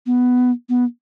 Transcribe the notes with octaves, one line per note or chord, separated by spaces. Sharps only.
B3
B3